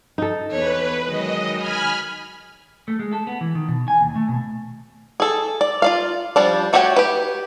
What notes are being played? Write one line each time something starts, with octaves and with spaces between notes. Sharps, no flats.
D#4 A4
E2 B4 C#5
D#3 F#3 G#3 D#5
G#5 B5 F6
A3
G#3
A4
B3
E3
D#3
B2
G#5
D#2
A3
B2
G#4 A4
D5
F4 D5 F5
F3 G3 D4
A3 F#4 G4 C#5 G5
G4 B4